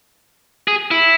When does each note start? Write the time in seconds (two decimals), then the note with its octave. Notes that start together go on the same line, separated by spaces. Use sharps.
0.68 G#4
0.91 E4